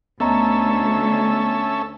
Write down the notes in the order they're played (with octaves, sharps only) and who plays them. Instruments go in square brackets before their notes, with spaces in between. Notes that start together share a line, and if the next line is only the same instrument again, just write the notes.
[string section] D2 [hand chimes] B3 D#5 A#5 [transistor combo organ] C#4 A4 E5